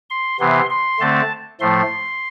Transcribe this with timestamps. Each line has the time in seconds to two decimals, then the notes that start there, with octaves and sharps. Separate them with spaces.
0.10 C6
0.40 C3 E3 B3 C6
0.70 C6
1.00 D3 A3 C4 A5
1.60 A2 F3 A3 C6